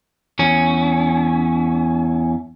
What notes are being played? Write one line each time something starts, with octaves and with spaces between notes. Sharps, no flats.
E2 C#4